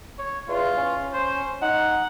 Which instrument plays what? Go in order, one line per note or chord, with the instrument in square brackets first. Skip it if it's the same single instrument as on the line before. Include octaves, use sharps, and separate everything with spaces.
[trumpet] C#5
[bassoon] E2 [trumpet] F4
[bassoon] C#4
[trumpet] C5
[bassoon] D#4 [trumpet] F#5